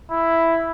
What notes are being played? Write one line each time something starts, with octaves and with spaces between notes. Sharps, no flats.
E4